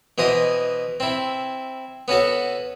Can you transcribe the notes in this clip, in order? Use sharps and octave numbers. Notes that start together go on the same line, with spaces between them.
B2 E3 C5 D#5 D#6
C4 E4
B3 C#4 F#4 A4